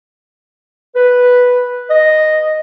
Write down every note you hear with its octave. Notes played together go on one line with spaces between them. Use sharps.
B4
D#5